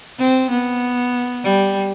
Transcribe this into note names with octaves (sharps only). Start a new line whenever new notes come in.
C4
B3
G3